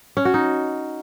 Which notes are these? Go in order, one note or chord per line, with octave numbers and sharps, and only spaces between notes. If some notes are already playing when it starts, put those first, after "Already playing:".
C#4
F#4
D#4